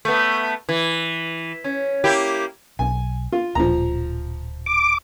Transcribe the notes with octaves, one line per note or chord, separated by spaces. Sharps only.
A3 B3
E3
C#4
A#3 E4 G4
B1 G#5
F4
D1 A#2 F3 A#5
D6